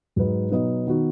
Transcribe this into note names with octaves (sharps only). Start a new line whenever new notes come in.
G#2 F#3 D#4 B4
B2 F#3 D#4 B4 D#5
D#3 B3 D#4 F#4